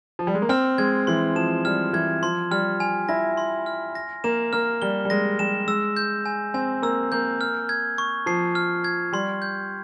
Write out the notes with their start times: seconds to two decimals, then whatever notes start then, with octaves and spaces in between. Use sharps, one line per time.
0.19 F3
0.27 G3
0.34 G#3
0.42 A#3
0.49 C4 F6
0.78 G#3 G#6
1.07 E3 C6
1.36 F3 E7
1.65 G3 F6
1.93 E3 G#6
2.22 F3 C6
2.51 G3 F6
2.80 G#5
3.09 E4 A#6
3.37 C6
3.66 F6
3.95 A#6
4.24 A#3 E7
4.53 A#3 F6
4.82 G3 G7
5.05 G3
5.10 G#3 A#6
5.39 G3 E7
5.67 G#3 E6
5.97 G6
6.26 G#5
6.54 C4 G#5
6.82 A#3 E6
7.12 A#3 G6
7.41 F6
7.69 G#6
7.98 C#6
8.26 F3 C7
8.55 F6
8.84 G#6
9.13 G3 C6
9.42 G6